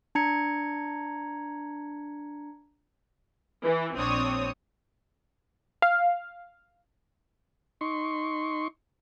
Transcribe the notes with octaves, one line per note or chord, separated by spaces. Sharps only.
D4 A#5 G#6 C#7
E3
A#1 C4 D4 C#5 D#6
F5
D#4 C6 C#6